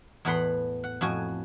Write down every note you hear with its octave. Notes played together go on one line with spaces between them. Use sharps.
E2 A2 B3 F#5 B5 C6
F#5
F2 A2 F#4 G#5